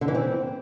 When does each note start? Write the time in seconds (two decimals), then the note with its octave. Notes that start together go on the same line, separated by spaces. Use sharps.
0.01 D3
0.08 E3
0.14 C4